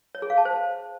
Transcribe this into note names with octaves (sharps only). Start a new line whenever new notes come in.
C#5
G#4
F5
A5
C5